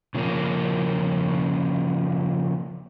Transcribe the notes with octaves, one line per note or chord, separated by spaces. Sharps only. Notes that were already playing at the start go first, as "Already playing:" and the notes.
C#3 F3 A#3 C#4